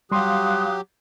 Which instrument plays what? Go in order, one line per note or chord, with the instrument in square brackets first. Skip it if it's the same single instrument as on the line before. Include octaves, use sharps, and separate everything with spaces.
[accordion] F#3 G4 [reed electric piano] G3 C6 [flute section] F5 D#6 F#6